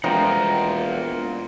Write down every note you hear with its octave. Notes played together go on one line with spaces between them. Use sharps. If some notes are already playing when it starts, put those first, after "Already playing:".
E1 F3 C4 F4 A#4 F#5 G5 A#5